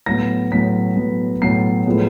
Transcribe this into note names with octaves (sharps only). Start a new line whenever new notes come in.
A2 F#3 B3 A#6
A2 F#3 B3 B6
A2 F#3 B3
A2 F#3 B3 C7
A2 F3 G#3 B3